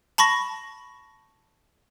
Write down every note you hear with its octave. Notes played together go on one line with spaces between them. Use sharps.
A5 B5 C#6 A#6